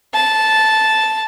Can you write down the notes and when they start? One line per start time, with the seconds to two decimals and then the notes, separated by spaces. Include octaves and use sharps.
0.14 A5